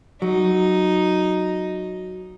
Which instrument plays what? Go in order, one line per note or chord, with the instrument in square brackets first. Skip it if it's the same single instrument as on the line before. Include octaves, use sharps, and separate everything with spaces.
[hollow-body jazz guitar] F#3 [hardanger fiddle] D#4